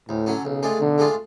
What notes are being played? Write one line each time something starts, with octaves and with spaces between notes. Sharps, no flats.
D2 A2
D3 F#3 C#4
B1 C#3
A2 G#3 D4 F4
B1 D3
A2 G#3 D4 F4